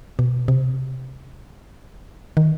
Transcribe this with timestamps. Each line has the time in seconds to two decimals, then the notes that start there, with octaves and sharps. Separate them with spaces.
0.19 B2
0.48 C3
2.37 D#3